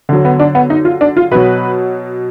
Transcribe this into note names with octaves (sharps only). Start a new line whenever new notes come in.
D3 F#3
B3
D4
B3
D#4
F4
D4
F4
B2 F#3 B4